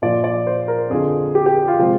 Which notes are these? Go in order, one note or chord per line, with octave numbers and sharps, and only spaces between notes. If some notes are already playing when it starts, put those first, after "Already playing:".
A#2 F3 A#3 D5
D5
C5
A#4
F2 D3 F3 G#4
G4
G4
F4
C3 F3 G#3 C4